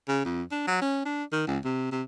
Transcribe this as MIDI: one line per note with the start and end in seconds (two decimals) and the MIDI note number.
0.08 0.24 49
0.25 0.43 41
0.52 0.64 62
0.68 0.82 54
0.82 1.03 61
1.06 1.24 62
1.32 1.46 51
1.47 1.59 37
1.65 1.92 48
1.92 2.03 48